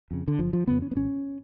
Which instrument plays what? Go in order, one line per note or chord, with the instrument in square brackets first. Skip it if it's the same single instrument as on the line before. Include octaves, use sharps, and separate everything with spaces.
[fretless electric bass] F2 C#3
D3
F#1 F3
F3
F2 C#3 B3
C#4
B3
G#1 C#4